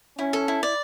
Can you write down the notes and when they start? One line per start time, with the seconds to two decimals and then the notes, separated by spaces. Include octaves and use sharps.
0.19 C#4 E4
0.33 A4
0.48 E4
0.63 D5